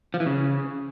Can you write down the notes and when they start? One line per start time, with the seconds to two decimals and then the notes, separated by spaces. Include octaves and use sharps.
0.14 F3
0.20 E3
0.26 C#3